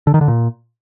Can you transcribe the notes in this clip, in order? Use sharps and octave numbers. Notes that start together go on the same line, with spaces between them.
D3
D#3
D3
A#2